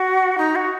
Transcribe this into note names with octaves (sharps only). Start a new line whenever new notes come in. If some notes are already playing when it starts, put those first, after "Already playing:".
Already playing: F#4
D#4
F#4